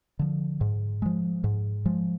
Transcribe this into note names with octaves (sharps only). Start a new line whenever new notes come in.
D3 F3
G#2
F3 G#3
G#2
F3 G#3